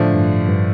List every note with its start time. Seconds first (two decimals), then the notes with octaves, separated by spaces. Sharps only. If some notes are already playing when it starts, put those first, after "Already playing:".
Already playing: A2 D3 F3 A3 D4
0.14 G2
0.49 G2